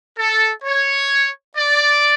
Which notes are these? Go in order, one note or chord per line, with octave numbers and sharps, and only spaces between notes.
A4
C#5
D5